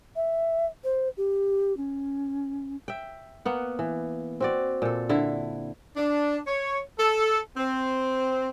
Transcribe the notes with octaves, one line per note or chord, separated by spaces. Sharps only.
E5
C5
G4
C#4
E5 G5
A#3 B3 F#5
E3
C4 F#4 D5
A#2 A4
D3 E4
D4
C#5
A4
C4